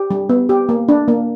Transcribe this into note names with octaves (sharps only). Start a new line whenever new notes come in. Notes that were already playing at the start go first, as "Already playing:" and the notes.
Already playing: G4
G3
B3
G4
A#3
D4
A#3